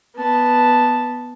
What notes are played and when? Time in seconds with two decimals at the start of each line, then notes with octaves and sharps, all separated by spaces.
0.16 B3 A5